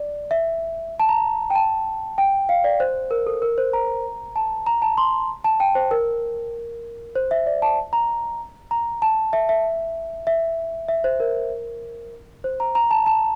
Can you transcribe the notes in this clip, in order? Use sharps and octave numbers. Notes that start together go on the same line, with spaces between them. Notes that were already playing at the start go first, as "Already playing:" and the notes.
Already playing: D5
E5
A5
A#5
G5
A5
G5
F5
D5
C5
A#4
A4
A#4
C5
A#5
A5
A#5
A5
C6
A5
G5
C5
A#4
C5
E5
D5
A5
A#5
A#5
A5
E5
E5
E5
E5
C5
A#4
C5
A#5
A#5
A5
A5